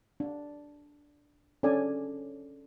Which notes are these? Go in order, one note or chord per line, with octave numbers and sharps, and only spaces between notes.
D4
C#4 D4 A4 D5 G#5